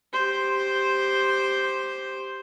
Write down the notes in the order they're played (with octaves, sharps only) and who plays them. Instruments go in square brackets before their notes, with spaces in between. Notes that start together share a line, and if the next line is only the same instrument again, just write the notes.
[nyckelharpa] G4 C5